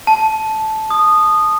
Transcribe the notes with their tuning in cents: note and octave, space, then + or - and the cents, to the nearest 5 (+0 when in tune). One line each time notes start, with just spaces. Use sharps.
A5 -10
D#6 -15